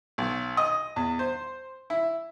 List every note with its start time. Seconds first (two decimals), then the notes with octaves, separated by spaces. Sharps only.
0.18 B1
0.57 D#5
0.96 E2
1.19 C5
1.90 E4